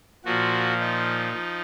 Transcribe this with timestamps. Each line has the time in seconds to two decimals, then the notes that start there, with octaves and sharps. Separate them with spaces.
0.25 A#2 F3 F#4
0.79 D#4
1.33 F3